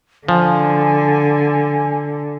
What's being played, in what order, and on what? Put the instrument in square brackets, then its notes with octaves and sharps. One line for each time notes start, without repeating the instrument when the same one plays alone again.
[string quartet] D3 [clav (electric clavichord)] F3 [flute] G#5